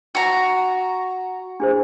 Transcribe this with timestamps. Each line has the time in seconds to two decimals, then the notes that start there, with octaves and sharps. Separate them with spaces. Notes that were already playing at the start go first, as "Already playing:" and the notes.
0.15 F#4 A#5
1.60 D4 G#4 C5